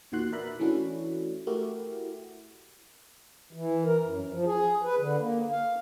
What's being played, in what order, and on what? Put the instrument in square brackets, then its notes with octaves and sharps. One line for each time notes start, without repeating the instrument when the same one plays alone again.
[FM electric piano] E2 A#2 D#3 F#4 C6 F#6
A#4 B4 D5 E5 B5 F#6
E3 A3 C#4 D4 E4 F#4
A3 E4 F#4 G4 A#4
[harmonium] E3
A#4
F#2
F3
G#4
B4
D3
A#3
F5